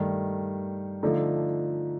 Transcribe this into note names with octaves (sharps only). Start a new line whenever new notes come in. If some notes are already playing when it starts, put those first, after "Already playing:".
Already playing: G2 D#3 A3
D3 F3 A3 D#4